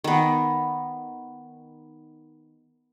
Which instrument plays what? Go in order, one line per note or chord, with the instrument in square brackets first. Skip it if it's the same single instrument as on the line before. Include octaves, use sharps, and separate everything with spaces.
[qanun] D#3 B3